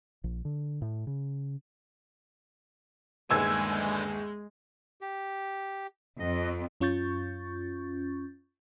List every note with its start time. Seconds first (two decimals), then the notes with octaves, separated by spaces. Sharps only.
0.24 A#1
0.45 D3
0.82 A2
1.07 C#3
3.31 G1 D#2 D3 G#3 G#5 E6 G#6
5.01 G4
6.20 F2 D#5
6.81 F#2 C#4 F4 C#6 G6 A6